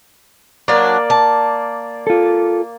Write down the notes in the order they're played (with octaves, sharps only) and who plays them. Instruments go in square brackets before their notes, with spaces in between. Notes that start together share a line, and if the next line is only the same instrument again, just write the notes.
[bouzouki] F#3 D4 [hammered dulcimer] A#3 D5
[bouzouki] A5
[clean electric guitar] F4 A4